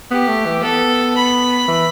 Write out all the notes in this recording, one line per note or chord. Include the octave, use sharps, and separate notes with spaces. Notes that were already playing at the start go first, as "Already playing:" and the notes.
B3 G4
A3
E3
B3 A4
B5
E3